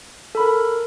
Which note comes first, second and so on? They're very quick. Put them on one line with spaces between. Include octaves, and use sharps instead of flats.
A4 B5 A#4